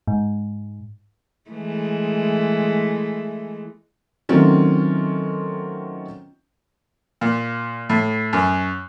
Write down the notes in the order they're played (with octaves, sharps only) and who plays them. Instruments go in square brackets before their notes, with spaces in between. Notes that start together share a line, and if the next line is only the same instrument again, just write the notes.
[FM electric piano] G#2
[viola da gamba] E3 G#3 A3
[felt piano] D#3 F#3 A3 C4 C#4 F4
[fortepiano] A#2
A2
F#2